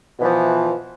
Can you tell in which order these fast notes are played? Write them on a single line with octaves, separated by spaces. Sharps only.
B2 E3 F3